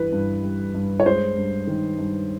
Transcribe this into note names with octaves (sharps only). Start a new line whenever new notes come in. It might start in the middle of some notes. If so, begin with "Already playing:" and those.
Already playing: G2 E3 G3 B4
G2
G3
G2
C#5
G#3 C5
G2
D#3
G2